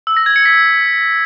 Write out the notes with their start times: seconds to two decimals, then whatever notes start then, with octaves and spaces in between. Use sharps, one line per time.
0.07 E6
0.17 A#6
0.26 G#6
0.36 C#7
0.45 B6